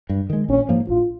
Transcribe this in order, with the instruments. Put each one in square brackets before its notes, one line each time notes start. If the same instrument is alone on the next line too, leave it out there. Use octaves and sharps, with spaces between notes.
[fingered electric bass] G2
D#3 G#3
[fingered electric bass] A#1 [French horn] C#4
[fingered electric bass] G#2 F3 A#3
[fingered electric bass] A#1 [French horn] F4